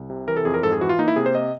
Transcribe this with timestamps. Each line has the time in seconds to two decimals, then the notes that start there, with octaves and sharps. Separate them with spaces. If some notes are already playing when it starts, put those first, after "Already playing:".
Already playing: C2
0.10 C3
0.28 E3 A#4
0.37 A4
0.45 F2 G#4
0.54 A#4
0.63 G#2 A4
0.72 G#4
0.81 E3 F#4
0.89 F4
0.99 A#3 D#4
1.08 E4
1.16 C3 G#4
1.26 C5
1.35 D#5